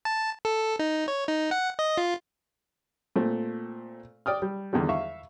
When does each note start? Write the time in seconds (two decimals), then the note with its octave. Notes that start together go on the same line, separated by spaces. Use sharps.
0.05 A5
0.45 A4
0.79 D#4
1.08 C#5
1.28 D#4
1.51 F#5
1.79 D#5
1.98 F4
3.16 A#2 A3 C4
4.26 D5 G5 D#6 F6
4.42 G3
4.73 E2 D3 D#3 G3
4.89 E5 F5 C#6